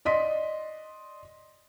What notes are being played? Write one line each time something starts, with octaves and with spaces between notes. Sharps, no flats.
D5 D#5 C6 B6